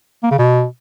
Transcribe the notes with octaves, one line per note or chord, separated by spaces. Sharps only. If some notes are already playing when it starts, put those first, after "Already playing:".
A#3
C#3
B2